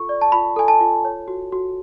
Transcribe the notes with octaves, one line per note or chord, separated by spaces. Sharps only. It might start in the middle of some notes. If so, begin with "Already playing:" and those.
Already playing: F4 A4 C#6
D5
A5
F4 B5
A4 G#5
A5
F4
C#5
F#4
F#4